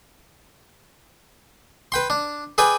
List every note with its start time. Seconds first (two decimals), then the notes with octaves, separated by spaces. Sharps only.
1.92 B4 G5 C6
2.10 D4
2.58 G#4 B4 D5 G5 G#5